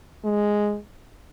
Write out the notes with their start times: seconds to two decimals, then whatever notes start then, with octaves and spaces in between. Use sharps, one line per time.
0.25 G#3